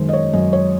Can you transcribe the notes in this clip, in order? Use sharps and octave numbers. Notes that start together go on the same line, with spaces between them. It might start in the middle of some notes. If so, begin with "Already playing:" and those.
Already playing: F#2 D#3 G#3 C5
D#5
C#5
F#2 D#5
C#5